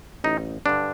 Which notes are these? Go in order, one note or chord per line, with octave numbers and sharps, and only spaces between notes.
A1 D#4
G2 D3 D4